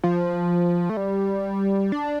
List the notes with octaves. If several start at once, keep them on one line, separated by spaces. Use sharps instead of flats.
F3
A3
G3
D4